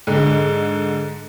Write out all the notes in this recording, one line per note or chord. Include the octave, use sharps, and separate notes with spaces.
G#2 D3